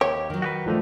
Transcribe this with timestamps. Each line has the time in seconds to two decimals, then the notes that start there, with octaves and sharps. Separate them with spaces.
0.01 D#2 G4 C#5
0.30 D#3 F#3
0.42 F#4 G4 B4
0.66 G2 D3 F3 A3 D#4